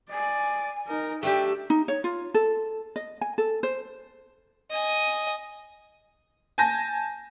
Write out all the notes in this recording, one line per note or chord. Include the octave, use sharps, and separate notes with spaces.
D5 G#5
D#4 A#4
A3 D4 G4 E5 G5
D#4
C#5
F4
A4
D#5
G#5
A4
C5
D#5 G#5
G#5 A5 G6 A#6